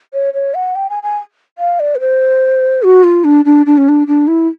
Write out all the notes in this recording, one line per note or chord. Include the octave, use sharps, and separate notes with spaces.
C#5
C#5
F#5
G5
G#5
G#5
F5
D5
B4
C5
F#4
F4
D4
D4
D4
C#4
D4
D4
E4